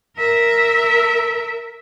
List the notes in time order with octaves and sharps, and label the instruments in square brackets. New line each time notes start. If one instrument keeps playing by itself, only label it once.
[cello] A#4 E5